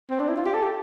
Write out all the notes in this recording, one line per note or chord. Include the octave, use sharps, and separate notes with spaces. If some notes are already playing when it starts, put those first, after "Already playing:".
C4
D4
E4
F4
G4
A4
G4